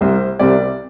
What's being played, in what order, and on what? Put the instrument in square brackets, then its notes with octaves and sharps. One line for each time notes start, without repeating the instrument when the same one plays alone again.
[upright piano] C2 C3 G3 C4 C5
C2 C3 G3 C4 D5